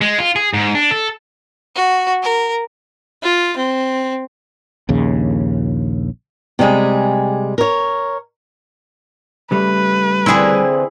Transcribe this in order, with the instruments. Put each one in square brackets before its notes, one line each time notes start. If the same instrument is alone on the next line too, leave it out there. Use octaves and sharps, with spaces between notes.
[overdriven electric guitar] G#3
F4
G#4
G#2
D4
A4
[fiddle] F#4
A#4
F4
C4
[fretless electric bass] A#1 D#2 C#3
[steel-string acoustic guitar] C3 G3 G#3 G#4
A#4 C#5
[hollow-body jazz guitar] C#3 G3 A3 [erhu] B4
[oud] D3 E3 C4 [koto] E4 G#4